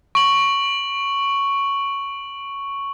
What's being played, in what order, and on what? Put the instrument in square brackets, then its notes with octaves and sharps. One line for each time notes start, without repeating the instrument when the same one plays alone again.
[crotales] C#6 F#7